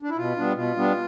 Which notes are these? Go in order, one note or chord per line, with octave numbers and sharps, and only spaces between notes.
D4
E4
B2 F4
G3 B3 D4
B2 F4
G3 B3 D4